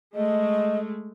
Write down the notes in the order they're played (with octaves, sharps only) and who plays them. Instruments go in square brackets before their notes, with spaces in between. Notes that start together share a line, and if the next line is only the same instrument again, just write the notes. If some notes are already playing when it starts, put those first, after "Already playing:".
[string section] G#3 A3 [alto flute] D#5